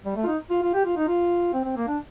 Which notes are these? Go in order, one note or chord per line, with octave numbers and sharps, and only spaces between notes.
G3
A3
F4
D#4
F4
F4
G4
F4
D#4
F4
C4
C4
A#3
D4